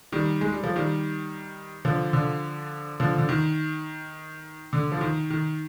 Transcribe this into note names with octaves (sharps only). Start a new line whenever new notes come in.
D#3 G3
G#3
G3
F3
D#3 G3
D3 F3
D3 F3
D3 F3
D3
D#3
D3
F3
D#3
D#3